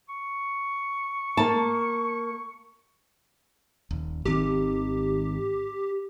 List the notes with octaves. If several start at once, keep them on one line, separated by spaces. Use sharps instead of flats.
C#6
A#3 A5
D#1
G#1 D#3 C4 G4